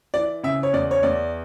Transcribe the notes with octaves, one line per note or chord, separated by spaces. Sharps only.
E3 D5
C#3 E5
C#5
E2 D5
C#5
E2 D5